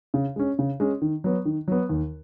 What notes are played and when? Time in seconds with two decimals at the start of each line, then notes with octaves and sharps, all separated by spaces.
0.14 C#3
0.36 G#3 C#4
0.59 C#3
0.80 G#3 C#4
1.02 D#3
1.24 F#3 B3
1.45 D#3
1.68 F#3 B3
1.89 D#2